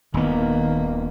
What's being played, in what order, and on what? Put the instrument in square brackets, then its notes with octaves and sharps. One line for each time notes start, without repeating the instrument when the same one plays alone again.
[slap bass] D#1 B3 [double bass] D#3 A#3